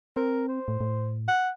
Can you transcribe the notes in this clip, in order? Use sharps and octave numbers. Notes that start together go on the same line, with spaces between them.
C4 A#4
C5
A2
A2
F#5